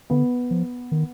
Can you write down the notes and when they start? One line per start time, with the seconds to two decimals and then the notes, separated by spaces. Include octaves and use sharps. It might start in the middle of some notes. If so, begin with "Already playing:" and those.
0.10 D3 B3
0.51 F3
0.92 D#3